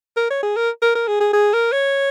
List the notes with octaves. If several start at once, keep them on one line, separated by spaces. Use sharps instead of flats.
A#4
C#5
G#4
A#4
A#4
A#4
G#4
G#4
G#4
A#4
C#5